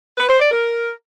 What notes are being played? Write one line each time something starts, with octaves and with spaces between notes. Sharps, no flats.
B4
C5
D5
A#4